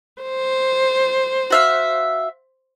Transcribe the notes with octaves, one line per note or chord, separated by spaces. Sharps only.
C5
F#4 E5 F5